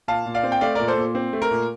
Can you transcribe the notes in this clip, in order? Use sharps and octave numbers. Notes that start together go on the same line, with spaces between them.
A#2 F5 A5
A#2
D5 F5
C4
G5
A3 D5 F5
A#2 A#4 D5
A4 C5
A#2
C4
A3
A#4
A#2